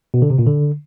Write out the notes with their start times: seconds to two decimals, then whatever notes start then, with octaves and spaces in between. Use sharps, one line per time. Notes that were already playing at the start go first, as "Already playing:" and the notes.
0.14 B2
0.22 D3
0.30 C3
0.39 A#2
0.47 D3